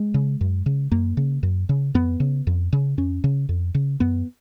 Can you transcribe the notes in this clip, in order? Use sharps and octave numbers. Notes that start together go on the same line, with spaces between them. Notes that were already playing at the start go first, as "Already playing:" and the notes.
Already playing: G#3
C#3
F#2
C#3
F#2 A#3
C#3
F#2
C#3
F2 B3
C#3
F2
C#3
F2 C#4
C#3
F2
C#3
F#2 B3